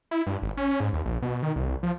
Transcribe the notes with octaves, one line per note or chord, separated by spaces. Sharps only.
E4
G2
G#1
C#4
G#2
D#2
A#1
B2
D#3
C2
F3